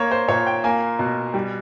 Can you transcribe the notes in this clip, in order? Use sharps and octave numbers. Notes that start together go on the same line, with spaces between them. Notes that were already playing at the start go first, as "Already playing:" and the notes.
Already playing: A#3 C#5
C5
A#2 C#5
G5
A#3 G#5
B2
G3